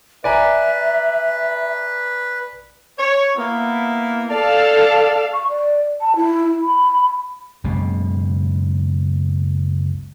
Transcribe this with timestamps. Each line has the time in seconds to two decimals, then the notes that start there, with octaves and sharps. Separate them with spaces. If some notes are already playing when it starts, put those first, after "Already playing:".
0.24 B4 D5 E5 G#5 A#5
2.98 C#5
3.37 A#3 B3 E4
4.31 A4 D5 F5 A5
5.33 C#6
5.49 D5
6.01 A5
6.16 E4
6.61 B5
7.64 F#1 C#2 B2